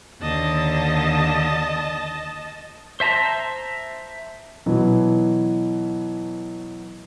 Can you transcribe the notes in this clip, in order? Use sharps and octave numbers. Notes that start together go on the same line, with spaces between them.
D#2 D3 D#5 A5
C5 E5 A5 A#5 C6
B2 E3 F#3